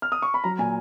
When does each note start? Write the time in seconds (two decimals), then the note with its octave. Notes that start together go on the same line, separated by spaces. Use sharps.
0.02 F6
0.12 D#6
0.22 C#6
0.34 B5
0.44 F#3 A#5
0.59 A#2 G#5